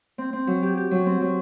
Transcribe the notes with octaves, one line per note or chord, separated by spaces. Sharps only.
C4
C4
F#3
G4
G4
F#3
C4
F#3